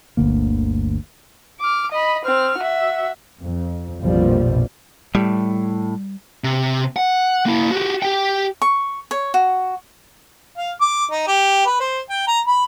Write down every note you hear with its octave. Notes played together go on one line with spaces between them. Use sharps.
G1 D2 D3 A#3
D6 F6
D#5 B5
C4 F6
F#4 E5
F2
A#1 F2 B2 F3 G3
A2 G3
C3
F#5
A#3 E4
F#4 G4
G4 G5
C#6
C#5
F#4
F5
D6
D#4
G4
B4
C5
G5
A#5
B5